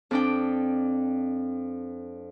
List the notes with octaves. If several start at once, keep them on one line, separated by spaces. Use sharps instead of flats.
F2 D4 G5